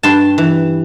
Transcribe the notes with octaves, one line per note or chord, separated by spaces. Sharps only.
G2 A5 C6
E3